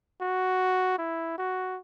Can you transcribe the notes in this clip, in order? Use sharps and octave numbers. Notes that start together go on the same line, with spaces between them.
F#4
E4
F#4